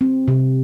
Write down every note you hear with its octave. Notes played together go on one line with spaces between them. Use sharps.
C4
C3